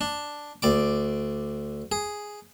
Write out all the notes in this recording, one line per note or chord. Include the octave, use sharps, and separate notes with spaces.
D4
D2 D5 D6
G#4